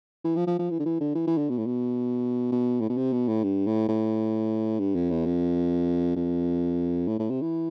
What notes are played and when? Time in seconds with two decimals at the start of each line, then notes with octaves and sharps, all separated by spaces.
0.24 E3
0.36 F3
0.47 F3
0.59 F3
0.71 E3
0.80 D3
0.86 E3
1.01 D3
1.15 E3
1.27 E3
1.38 D3
1.50 B2
1.58 A2
1.66 B2
2.52 B2
2.81 A2
2.89 B2
2.97 C3
3.13 B2
3.28 A2
3.44 G2
3.67 A2
3.89 A2
4.80 G2
4.95 F2
5.11 E2
5.26 F2
6.16 F2
7.08 A2
7.19 A2
7.30 C3
7.42 E3